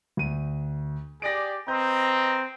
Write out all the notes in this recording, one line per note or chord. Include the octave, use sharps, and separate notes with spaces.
D2 D#7
G4 G#4 D5 A#6 D7
C4 B4 D#5 A#5 G6